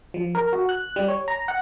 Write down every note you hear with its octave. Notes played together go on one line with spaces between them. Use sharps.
F3
A#4
F#4
F#6
G3
C#5
A#5
F#5